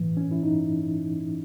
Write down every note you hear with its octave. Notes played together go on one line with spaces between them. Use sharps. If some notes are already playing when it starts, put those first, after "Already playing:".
Already playing: A2 E3
C#4
E4
D#4